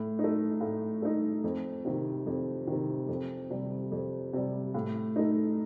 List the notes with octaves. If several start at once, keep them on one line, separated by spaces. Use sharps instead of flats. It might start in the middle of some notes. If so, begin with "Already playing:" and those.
Already playing: A2
A3 D#4
A2
A3 D#4
F2
C3 D#3
F2
C3 D#3
F2
C3 G3
F2
C3 G3
A2
A3 D#4